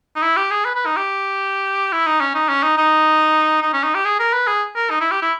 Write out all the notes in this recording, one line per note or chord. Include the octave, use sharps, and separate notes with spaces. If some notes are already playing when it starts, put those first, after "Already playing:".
D#4
E4
G4
G#4
B4
B4
D#4
G4
E4
D#4
C#4
D#4
C#4
D#4
D#4
D#4
C#4
D#4
G4
G#4
A#4
B4
G#4
A#4
D#4
E4
G4
E4